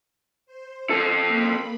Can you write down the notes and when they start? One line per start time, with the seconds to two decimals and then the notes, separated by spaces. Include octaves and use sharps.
0.46 C5
0.90 C4 A4
1.27 A#3 B5